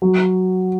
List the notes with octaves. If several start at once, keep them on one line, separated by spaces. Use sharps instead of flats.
F#3